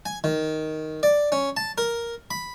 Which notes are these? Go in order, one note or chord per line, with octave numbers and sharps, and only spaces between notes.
G#5
D#3
D5
C#4
A5
A#4
B5